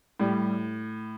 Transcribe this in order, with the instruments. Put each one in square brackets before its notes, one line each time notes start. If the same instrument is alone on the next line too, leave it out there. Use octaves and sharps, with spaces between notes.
[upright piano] A2 [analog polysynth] G3